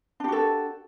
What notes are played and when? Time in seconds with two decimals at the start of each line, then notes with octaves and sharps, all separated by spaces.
0.20 D4
0.24 G4
0.28 F#4
0.32 A4